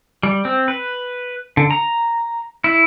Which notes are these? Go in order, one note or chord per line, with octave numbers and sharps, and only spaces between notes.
G3
C4
B4
D3
A#5
E4